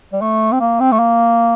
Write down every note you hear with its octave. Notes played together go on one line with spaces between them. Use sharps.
G3
A3
C4
A#3
C4
A3
A#3